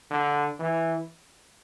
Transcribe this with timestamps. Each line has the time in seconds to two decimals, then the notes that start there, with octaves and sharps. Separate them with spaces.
0.11 D3
0.60 E3